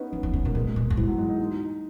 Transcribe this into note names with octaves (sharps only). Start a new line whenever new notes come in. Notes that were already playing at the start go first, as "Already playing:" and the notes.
Already playing: B3 C#4 D#4
E3
E3
C#3
B2 A#3
A#2 G#3
G#3
A#2
F#2
G#2 E3
F#3
G#3
D#4
D#4